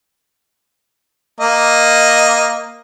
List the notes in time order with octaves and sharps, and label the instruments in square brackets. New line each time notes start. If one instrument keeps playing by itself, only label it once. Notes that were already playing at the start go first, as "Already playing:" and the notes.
[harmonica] A#3 D#5